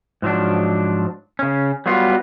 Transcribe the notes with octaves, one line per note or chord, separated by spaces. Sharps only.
G#2 F3 F#3 D4
C#3 C#4
F#3 G3 B3 F4 F#4